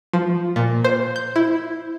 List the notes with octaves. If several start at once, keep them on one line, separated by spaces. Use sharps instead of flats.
F3
A#2
C5
G6
E4